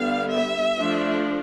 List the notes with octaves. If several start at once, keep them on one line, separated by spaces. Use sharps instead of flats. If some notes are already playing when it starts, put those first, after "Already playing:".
Already playing: D3 G3 B3 F5
E5
F3 A3 D4